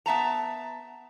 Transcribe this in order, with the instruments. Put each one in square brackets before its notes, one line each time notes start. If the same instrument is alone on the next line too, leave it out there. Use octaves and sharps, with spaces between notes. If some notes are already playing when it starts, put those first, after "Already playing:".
[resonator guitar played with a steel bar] B3 E5 A5 A#5